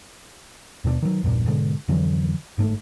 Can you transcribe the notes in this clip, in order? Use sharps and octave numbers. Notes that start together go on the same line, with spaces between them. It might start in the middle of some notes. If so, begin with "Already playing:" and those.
D#2 B2 A3 D4
D#3 F#3
A#1 E2 G2 A#2
G#2 B2 D3 G#3
F2 D3 E3 F#3
G1 G#2 A3